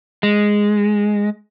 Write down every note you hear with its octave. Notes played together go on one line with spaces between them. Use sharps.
G#3